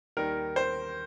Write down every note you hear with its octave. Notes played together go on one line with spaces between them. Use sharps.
D#2 D#3 G3 A#4
C5